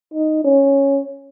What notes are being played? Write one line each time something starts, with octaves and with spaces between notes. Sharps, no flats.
D#4
C#4